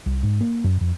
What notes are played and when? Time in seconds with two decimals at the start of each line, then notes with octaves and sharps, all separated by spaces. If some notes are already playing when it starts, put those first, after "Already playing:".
0.06 C2
0.23 G#2
0.41 A#3
0.64 F#2
0.81 F2